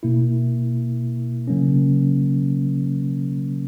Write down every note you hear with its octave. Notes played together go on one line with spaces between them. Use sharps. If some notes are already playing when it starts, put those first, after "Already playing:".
B2 A#3 E4
C#3 F#3 A#3 C#4